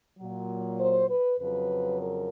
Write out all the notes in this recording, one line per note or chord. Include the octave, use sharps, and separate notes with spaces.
A#2 F#3
C5
B4
F2 C#3 F#3 B4
A#4